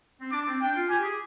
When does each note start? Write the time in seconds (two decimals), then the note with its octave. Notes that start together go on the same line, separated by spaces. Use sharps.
0.21 C4
0.32 D4 D6
0.47 C4
0.61 D4 G5
0.76 F4
0.90 G4 G#5
1.04 G#4